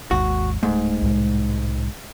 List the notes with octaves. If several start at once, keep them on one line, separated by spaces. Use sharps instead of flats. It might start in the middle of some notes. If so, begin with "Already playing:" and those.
G#1 D#2 G#2 F#4
D1 G#2 A3
C2 A2 G#3